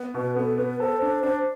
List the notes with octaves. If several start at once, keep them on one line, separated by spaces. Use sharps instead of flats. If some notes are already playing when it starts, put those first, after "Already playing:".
Already playing: B3
B2 B4
B3 A4
B3 B4
A4 C5
D4 C5
D4 C5